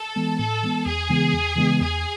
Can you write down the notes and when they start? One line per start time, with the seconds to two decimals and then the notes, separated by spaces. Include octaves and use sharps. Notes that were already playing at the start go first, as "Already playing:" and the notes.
Already playing: A4
0.16 E3 G#3 B3
0.39 A2 A4
0.63 E3 G#3 B3
0.86 E2 G#4
1.09 C#3 E3 G#3 B3
1.33 E2
1.56 C#3 E3 G#3 B3
1.80 E2 G#4